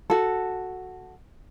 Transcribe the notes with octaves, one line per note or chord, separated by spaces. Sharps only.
F#4 A4